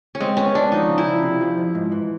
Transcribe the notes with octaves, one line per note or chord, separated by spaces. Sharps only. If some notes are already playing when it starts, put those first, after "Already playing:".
C#4
G#3 C4
B3 C#4
G#3 D4
F3 D#4
C#3
E4
F3
C3
F3
F2
G#2
E3